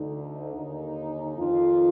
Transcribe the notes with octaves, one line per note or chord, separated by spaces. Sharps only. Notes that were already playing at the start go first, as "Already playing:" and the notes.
Already playing: D2 D3 D#4
D#2 D3
F2 D#3 F4